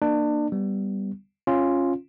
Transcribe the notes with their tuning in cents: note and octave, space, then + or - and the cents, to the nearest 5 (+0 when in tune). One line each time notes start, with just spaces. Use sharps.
A#3 +0 D4 +30
G3 +0 B3 +10
C#4 -15 F4 +0